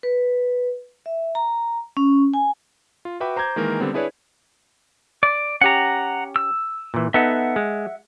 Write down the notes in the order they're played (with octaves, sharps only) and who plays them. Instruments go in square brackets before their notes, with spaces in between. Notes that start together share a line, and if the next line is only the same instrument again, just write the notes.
[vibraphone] B4
E5
A#5
C#4
G#5
[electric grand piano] F4
F#4 B4 E5 G5 B5 D6
C5 A#5 D6 G6 G#6
D#3 E3 G#3 A#3 A#4
D3 G3 B3 C4
D4 E4 G#4 B4 C#5 D5
[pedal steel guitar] D5
[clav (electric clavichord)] C#4 G4 [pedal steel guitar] F#5 A#5
[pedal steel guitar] E6
[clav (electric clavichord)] A#2 E3
[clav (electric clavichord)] B3 D#4 A4 [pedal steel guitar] E5 F#5
[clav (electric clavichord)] G#3